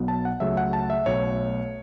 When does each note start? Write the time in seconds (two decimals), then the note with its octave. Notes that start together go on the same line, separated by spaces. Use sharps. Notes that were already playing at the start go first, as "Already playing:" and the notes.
Already playing: B1 B2 F#3 B3
0.08 A5
0.25 F#5
0.40 C#2 C#3 F#3 A3 E5
0.57 F#5
0.73 A5
0.90 E5
1.06 B1 B2 A3 C#5